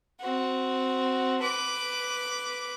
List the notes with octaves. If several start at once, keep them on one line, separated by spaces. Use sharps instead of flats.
C4 F#4
B4 D6